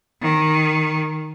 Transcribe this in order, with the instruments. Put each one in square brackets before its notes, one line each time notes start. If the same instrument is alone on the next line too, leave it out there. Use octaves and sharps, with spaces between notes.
[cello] D#3